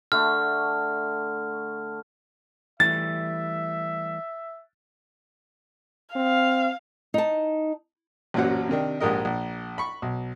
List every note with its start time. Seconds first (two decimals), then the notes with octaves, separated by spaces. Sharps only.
0.12 D3 A3 F6
2.80 E3 G3 A3 E5 A6
6.16 C4 F5
7.14 D#4 A5
8.34 A1 F#2 A#2 F#3 C5 F#5
8.69 C3 D#3 D4
9.00 A#1 G#2 G4 A#4 D#5
9.25 A#1
9.78 B5 C#6
10.02 B1